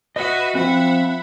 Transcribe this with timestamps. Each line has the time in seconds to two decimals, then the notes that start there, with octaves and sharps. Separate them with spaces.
0.16 F#4 B4 D#5 E5 F#5
0.55 F3 C4 E5 F#5 B5